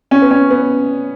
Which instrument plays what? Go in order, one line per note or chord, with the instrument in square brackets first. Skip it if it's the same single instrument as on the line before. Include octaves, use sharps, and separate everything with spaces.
[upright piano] C#4
B3
C#4
B3